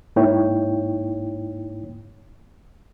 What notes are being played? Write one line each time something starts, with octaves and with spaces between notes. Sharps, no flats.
G#2 A#3 D#4 E4 C#5 G5